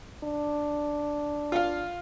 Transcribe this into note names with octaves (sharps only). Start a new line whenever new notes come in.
D4
F4 F5